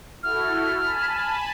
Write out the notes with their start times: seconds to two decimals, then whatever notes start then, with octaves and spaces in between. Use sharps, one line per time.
0.23 E4 F#4 A4 F6
0.82 G#5 A5 B5